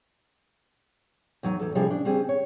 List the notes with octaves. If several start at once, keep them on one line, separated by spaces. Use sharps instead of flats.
E2 F#3 D#4 E5 G#5
E2 A4
C3 F3 G3 C#4 E4 G#4
D4
C#3 G3 C4 G#4
C#5